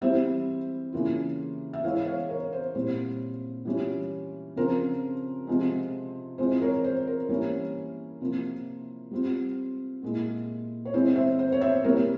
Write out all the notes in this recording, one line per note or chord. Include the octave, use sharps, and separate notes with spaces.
E3 G3 C4 E4 C5 E5
C#3 E3 A#3 F4
E5
E3 G#3 E4 C#5 F5
C#5 F5
A#4 C#5
C5
A#2 G3 C4 E4 C5
E3 G3 C#4 F4
C#3 F3 C4 A#4
C3 F3 G#3
E3 G#3 C4 F4 C5
A#4 C#5
C5
A#4
E3 G3 A#3 C#4 E4 A#4
C3 F3 A#3 E4
G3 C4 F4
A#2 G#3 E4
C#5
E3 G#3 C4 E4 C5
C5 E5
C5
C#5
C5 E5
C3 G3 A#3 E4 A#4 C#5